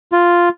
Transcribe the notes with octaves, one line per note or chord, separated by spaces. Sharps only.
F4